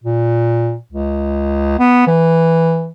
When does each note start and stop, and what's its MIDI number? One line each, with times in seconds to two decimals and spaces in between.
0.04 0.75 46
0.92 1.74 37
1.79 2.06 59
2.07 2.90 52